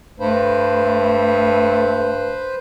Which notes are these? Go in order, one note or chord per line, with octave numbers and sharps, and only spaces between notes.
G2 A3 B4 C5